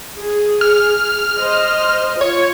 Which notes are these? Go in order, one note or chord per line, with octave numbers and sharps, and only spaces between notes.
G#4
F6
C5 D#5
F4 C#5